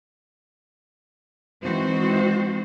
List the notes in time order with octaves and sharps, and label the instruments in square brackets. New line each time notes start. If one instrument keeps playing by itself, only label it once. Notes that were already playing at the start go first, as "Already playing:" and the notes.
[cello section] E3 G#3 C4 D#4 F#4 C5